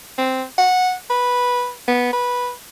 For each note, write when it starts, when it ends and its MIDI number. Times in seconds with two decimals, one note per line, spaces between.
0.18 0.43 60
0.58 0.94 78
1.10 1.71 71
1.88 2.12 59
2.13 2.52 71